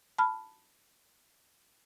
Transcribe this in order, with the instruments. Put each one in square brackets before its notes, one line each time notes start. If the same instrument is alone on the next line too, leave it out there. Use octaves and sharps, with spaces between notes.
[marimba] A5 B5 F6